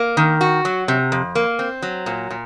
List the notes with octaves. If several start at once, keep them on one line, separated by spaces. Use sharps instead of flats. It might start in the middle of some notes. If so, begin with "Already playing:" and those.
Already playing: A#3
D#3
F#4
F#3
C3
F2
A#3
C4
F#3
A#2
A#2